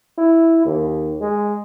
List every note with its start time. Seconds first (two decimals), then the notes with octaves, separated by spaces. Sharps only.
0.18 E4
0.66 D#2
1.21 G#3